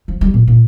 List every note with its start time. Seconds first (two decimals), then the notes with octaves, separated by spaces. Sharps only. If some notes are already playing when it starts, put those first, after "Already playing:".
0.08 F3
0.21 G3
0.34 A#2
0.47 A#2